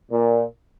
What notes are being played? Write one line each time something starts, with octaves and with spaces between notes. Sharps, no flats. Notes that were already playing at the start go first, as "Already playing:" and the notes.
A#2